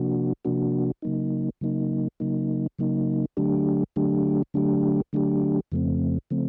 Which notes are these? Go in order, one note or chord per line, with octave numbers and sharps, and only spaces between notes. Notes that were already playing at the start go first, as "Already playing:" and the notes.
Already playing: C3 F3 A#3 D4 F#4
C3 F3 A#3 D4 F#4
C#3 F#3 A#3 D#4
C#3 F#3 A#3 D#4
C#3 F#3 A#3 D#4
C#3 F#3 A#3 D#4
D3 F#3 A3 D4 G4
D3 F#3 A3 D4 G4
D3 F#3 A3 D4 G4
D3 F#3 A3 D4 G4
F2 C#3 F3 A3 C4
C#3 F3 A3 C4